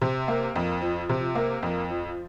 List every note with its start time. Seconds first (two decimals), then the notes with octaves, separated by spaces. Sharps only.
0.02 C3
0.28 A#3
0.56 F2
0.81 F3
1.09 C3
1.35 A#3
1.63 F2
1.90 F3